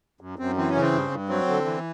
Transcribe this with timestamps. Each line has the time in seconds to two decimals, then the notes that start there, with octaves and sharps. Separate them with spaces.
0.21 F#2
0.39 F#2 C4
0.57 E3 C4
0.69 C#4
0.75 C#3
0.82 C4
0.92 G2
1.11 G2
1.29 F#3 C4
1.48 D3
1.65 E3